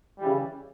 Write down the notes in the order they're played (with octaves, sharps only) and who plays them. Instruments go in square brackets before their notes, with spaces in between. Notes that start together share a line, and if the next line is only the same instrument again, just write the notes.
[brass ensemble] C#3 E3 G3